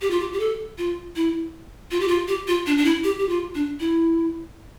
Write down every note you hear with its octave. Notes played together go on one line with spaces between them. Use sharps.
G4
F4
G4
G4
A4
F4
E4
F4
G4
F4
G4
F4
D4
D4
E4
G4
G4
F4
D4
E4